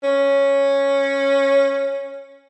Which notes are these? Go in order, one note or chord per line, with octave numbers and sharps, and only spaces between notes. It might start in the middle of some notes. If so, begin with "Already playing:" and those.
C#4